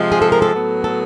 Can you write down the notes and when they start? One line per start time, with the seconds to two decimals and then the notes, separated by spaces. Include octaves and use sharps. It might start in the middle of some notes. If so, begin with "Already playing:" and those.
Already playing: C3 F3 G#3
0.12 G#4
0.22 A4
0.32 A#4
0.42 A4
0.53 A2 F#3 B3
0.84 A4